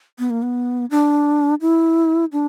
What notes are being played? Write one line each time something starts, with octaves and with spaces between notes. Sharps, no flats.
B3
A#3
B3
D4
E4
D4